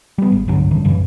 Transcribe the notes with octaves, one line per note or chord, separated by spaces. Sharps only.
G3 B3
G#1
C2 G2 D3 F#3
A1 G2 D#3
A1 F#2 C#3 E3